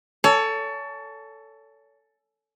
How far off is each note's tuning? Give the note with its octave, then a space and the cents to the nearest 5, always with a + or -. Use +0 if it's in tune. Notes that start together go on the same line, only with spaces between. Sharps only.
A4 +10 C#5 +30 G#5 +30